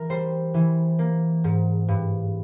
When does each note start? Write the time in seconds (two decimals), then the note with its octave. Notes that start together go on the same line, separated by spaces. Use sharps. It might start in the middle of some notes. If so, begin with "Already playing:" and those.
Already playing: E3 A#4
0.10 G3 C5
0.54 E3
0.99 A#3
1.44 G#2
1.88 G2